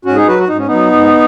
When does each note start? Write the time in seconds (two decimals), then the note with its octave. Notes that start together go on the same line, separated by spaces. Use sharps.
0.05 G#2 C#4 F#4
0.16 D#4 G#4
0.27 F#3 F#4 B4
0.38 F#4
0.48 G#2 D#4
0.58 C#4
0.67 F#3 B3 D#4
0.92 G#2